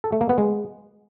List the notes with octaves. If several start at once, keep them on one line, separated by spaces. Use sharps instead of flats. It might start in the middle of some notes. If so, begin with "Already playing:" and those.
A4
A3
A#3
B3
G#3